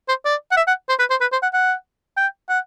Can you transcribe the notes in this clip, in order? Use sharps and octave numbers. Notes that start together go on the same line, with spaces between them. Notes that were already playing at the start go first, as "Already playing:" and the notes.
C5
D5
F#5
E5
F#5
C5
B4
C5
B4
C5
F#5
F#5
G5
F#5